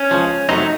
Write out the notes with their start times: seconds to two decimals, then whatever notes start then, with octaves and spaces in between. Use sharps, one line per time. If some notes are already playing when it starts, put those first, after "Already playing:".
Already playing: C#4
0.11 C#2 C#3 F3
0.49 F2 C3 F#3 A3 C4 D#4